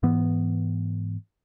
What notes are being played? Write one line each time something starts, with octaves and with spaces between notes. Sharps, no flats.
G#2 E3 B3